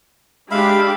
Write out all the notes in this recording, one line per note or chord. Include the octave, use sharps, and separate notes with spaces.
G#3 D4 G4 E5 F5 B5